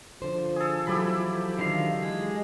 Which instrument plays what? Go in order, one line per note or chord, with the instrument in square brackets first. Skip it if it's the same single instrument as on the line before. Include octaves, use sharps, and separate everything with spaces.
[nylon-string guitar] D3 C5 [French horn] F3
[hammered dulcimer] G#4 A4
[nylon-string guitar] E3 F#3 A3 [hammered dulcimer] E4 G4 B5
[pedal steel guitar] D3 D#3 F5
G#3